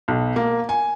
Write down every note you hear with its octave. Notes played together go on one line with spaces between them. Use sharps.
B1
A#3
G#5